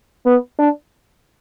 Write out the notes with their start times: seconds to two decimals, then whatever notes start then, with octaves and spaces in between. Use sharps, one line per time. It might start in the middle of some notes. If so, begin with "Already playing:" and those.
0.26 B3
0.59 D4